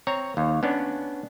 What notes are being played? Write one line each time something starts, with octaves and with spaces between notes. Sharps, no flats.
C4 C#5 A#5
D#2
B3 C#4 D4